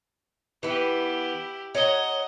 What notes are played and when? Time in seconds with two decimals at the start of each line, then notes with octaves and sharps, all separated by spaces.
0.63 E3 B3 E4 G4
1.75 C#5 D#5 F#5 A#5